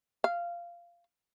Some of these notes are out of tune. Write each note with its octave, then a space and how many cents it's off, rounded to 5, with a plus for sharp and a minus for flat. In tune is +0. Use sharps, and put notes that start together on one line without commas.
F5 -15